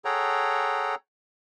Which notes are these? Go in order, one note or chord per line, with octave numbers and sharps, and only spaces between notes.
G#4 A4 C#5 F#5 G5 A#5